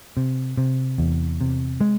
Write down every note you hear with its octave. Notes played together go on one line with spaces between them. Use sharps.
C3
C3
E2
C3
G#3